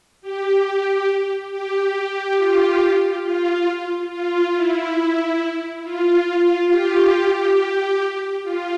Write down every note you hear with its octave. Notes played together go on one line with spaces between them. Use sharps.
G4
G4
G4
F4
F4
F4
E4
F4
F4
G4
G4
G4
F4